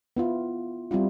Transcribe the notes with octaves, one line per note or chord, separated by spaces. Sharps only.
B3 E4 F4
G3 C4 E4 F4